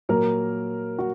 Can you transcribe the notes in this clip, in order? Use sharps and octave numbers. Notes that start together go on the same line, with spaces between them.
A#2 F#3 A#3 A#4
F#4